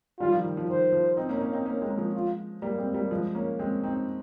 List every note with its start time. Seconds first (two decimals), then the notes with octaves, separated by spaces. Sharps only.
0.20 D#3 G3 F4
0.32 F3
0.44 D#3
0.57 F3
0.68 D#3 C5
0.92 F3
1.17 C4 D#4
1.29 A#3 C#4
1.36 D#4
1.41 A#3 C#4
1.53 C4 D#4
1.66 A#3 C#4
1.81 G#3 C4
1.90 A#3
1.98 F3 G#3
2.13 F4
2.62 G3 A#3
2.78 G#3 C4
2.94 G3 A#3
3.11 F3 G#3
3.35 A#3 C#4
3.59 G#3 C4
3.83 C4 D#4